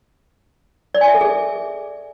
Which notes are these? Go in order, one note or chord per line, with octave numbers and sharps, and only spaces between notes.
D5
G#5
E5
A4
G#4